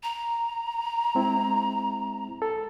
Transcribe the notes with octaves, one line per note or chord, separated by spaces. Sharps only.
A#5
G#3 C4 E4
A4